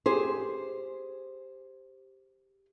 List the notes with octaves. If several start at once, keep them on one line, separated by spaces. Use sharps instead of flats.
G4 G#4 C5